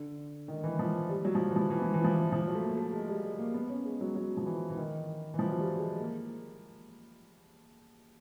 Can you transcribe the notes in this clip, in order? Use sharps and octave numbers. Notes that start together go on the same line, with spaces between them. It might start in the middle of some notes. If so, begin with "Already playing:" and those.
Already playing: D3
D#3
E3
F3
G3
F#3
F3
F#3
E3
F3
E3
F3
E3
F3
E3
F3
F#3
A3
A#3
A3
G#3
G3
G#3
A#3
B3
C#4
G#3
F#3
F#3
F3
E3
E3
D#3
E3
F3
F#3
G3
G#3
A#3